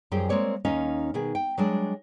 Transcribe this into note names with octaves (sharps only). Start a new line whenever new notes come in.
F#2 F3 G3 G4 G#4 G5
G#3 A#3 C4 C#5 D5
D#2 C#4 D#4 D#5 F5
B2 D#3 G#4
G5
F#3 G#3 D4